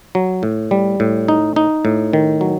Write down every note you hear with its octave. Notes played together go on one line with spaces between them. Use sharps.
F#3
A2
G3
A2
D#4
D#4
A2
D#3
F#3